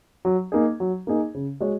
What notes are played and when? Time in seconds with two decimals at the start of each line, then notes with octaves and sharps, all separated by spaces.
0.25 F#3
0.52 A#3 D#4 G#4
0.80 F#3
1.07 A#3 D#4 G#4
1.34 C#3
1.61 G#3 F#4 C#5